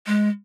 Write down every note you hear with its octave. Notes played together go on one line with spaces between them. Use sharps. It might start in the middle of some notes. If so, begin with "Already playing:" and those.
G#3